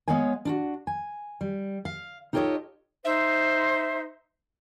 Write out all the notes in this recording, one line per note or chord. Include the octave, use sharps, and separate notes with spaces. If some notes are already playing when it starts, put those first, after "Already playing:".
G#3 B3 C#5 F5 G#5
D4 F4 F#4
G#5
G3
F5
D#4 F4 G4 A4 C#5 D#5
D#4 C5 E5